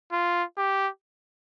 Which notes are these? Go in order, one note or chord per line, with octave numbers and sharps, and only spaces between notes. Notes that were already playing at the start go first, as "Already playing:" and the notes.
F4
G4